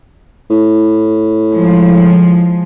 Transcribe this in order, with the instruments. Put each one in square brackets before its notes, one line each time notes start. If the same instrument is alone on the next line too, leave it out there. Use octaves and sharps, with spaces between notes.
[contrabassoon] A2
[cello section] F3 G#3